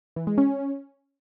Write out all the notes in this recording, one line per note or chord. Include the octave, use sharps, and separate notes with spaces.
E3
G#3
C#4